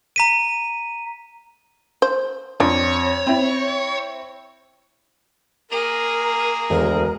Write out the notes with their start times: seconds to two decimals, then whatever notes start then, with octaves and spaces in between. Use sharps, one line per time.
0.16 A#5 B6 D#7
2.02 C5
2.60 F2 D4 C#5
3.27 C4 E4
5.71 A#3 G#4 A#4
6.70 E1 D2 A#4